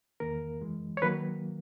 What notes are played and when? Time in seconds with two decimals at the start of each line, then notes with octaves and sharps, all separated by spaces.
0.20 E2 D#3 A#3 A#4
0.61 F#2 E3 G#3
0.97 C#5
1.02 D#3 F#3 A#3 B4